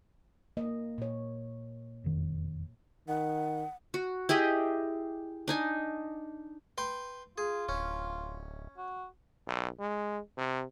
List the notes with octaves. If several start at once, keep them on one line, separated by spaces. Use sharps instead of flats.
A#3 D#5
A#2 C#5
E1 F2 D#3
D#3 F#5
F#4
E4 G4 G#4 D#5
D4 D#4 G#5
B4 G5 C6
F4 G#4
D1 C#4
F#4
B1
G#3
C3